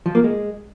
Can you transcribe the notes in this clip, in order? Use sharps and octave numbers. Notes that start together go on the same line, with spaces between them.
F3
A#3
G#3